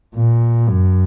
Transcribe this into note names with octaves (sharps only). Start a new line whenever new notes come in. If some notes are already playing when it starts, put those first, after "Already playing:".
A#2
F#2